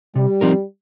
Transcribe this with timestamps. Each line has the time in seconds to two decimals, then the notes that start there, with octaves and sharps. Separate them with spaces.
0.15 C3 G3
0.41 F3 C4 D#4 A#4